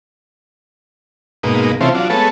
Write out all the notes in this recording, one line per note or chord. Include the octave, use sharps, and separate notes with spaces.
G#2 B2 A#3 D#4
C3 E3 F3 A3 C4 C#4
F3 F#3 D4
G#3 A3 B3 A4 C#5